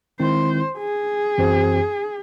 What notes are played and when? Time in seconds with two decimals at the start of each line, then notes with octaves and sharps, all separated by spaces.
0.20 D#3 G#3 C4 E4 C5
0.78 G#4
1.38 F#2 E3 C4 F#4 C5